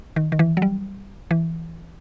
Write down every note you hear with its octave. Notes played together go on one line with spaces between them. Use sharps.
D#3
D#3
E3
F#3
G3
E3